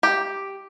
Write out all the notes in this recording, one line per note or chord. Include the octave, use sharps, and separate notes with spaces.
G4